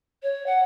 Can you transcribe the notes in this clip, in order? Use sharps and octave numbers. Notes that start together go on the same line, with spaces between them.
C#5
F#5